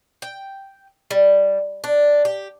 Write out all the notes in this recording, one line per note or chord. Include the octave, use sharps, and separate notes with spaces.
G5
G3
D4
G4